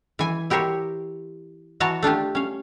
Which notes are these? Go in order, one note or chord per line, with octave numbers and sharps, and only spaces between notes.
E3 G#5
E4 G4 A#4 C5 C#5
E3 F#4 C#5 A5 A#5
A3 D4 F4 G4
C#4 F5